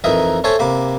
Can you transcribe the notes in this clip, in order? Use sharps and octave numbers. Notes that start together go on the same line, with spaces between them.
F2 E3 D#4 A#4 E5 D#6
A4 C5 C#5 E5 G#5
C3 A#3 B5 D6